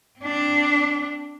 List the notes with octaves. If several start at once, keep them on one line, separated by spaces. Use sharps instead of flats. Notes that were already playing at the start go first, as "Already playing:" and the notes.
C4 D4